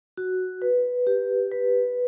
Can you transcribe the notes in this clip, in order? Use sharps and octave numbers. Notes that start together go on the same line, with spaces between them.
F#4
B4
G4
B4